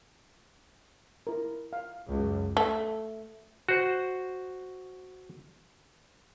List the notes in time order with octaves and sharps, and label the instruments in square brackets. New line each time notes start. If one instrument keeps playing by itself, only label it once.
[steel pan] E4 A#4
F5
[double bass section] C#2 F#2
[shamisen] A3
[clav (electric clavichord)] F#4 C5